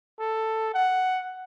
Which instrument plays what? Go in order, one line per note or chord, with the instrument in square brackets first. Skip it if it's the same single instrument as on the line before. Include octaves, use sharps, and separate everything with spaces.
[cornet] A4
F#5